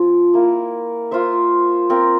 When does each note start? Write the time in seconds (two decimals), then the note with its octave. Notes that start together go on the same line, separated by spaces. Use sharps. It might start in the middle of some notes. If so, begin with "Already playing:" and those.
Already playing: F3 C4 F4
0.34 A#3 E4 A#4
1.11 A#3 F4 C5 E5
1.89 C4 F4 A#4